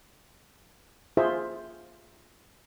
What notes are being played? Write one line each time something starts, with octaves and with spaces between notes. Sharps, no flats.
F4 G#4 C5 E5